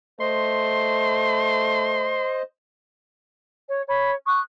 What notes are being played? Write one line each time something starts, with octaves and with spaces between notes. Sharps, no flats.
A3 C5 D#5 C6
C#5
C#5 B5
C#6 D#6 F#6